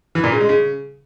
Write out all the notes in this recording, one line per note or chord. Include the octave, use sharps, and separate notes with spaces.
E3
A#2
C#3
G#3
C#3